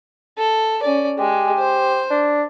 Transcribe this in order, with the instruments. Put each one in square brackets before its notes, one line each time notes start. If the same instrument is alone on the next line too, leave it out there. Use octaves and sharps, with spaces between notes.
[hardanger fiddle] A4
C#4 D5
[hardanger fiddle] G#3 [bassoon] G4
[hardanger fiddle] C5
[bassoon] D4